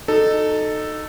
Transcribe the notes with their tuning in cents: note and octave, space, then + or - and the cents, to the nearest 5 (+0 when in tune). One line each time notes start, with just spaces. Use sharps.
D#4 -20 F#4 +0 A4 +0